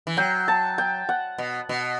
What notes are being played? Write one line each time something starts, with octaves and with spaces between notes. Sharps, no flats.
E3
F#3 G5
A5
G5
F#5
B2
B2